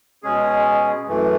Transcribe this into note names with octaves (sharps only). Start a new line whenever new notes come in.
B2 G#3 C#4 G#4
F#2 E3 A3